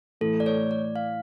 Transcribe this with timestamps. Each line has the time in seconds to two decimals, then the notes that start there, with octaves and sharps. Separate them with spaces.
0.21 A2 E3 A3 A4
0.40 D5
0.46 C#5
0.71 D5
0.96 F5